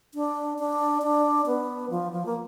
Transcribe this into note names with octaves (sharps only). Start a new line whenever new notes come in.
D4
D4
D4
B3
F3
F3
A#3